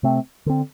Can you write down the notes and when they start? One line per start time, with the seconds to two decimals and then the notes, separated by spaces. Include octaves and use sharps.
0.03 C3 A3 C4
0.46 D3 C4